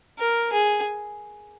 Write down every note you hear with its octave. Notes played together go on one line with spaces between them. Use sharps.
A#4
G#4